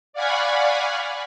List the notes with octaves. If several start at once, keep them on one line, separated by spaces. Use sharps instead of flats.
D5 F5 F#5 G#5 B5 C#6